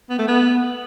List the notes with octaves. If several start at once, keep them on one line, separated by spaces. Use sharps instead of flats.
B3
A3
B3